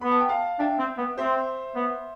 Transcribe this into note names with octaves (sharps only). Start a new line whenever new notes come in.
B3 B5
A5
G5
F5 A5
D4 E5 G5
C4
B3
C4 C5 E5
B3